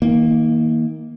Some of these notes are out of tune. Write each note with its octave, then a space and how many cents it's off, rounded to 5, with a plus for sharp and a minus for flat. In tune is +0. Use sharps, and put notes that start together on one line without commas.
D#3 +35 A#3 +0